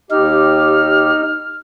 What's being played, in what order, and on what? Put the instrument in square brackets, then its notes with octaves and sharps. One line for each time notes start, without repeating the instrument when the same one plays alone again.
[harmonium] D#2 G4 [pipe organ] D#4 [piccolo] F6